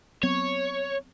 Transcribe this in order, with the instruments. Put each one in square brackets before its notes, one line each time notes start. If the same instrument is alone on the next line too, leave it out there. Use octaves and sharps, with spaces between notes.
[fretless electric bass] F#3 B3 C4 [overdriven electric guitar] C#5